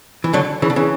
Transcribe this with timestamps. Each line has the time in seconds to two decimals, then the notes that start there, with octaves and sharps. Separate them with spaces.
0.24 E3
0.33 D3 F#3
0.62 C#3 E3
0.70 D3
0.76 C#3 E3